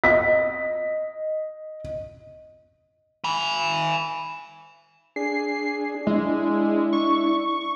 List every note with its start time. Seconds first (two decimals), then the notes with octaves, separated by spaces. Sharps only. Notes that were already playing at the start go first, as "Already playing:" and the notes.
0.04 D#5 B6
3.24 G#5 B5
5.16 D4 G#4 C7
6.07 G#3 D4 E4
6.93 C#6